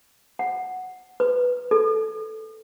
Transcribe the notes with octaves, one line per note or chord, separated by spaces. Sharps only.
F#5
B4
A4